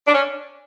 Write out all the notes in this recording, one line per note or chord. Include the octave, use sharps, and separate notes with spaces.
D4
C#4